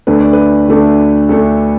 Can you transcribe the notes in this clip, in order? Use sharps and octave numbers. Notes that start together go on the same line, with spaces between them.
D2 D3 A3 D4 B4
D5
B4
D2 D3 A3 D4
D2 D3 A3 D4 A4